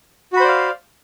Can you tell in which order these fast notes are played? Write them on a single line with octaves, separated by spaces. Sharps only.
F#4 B5 C5 D5 F5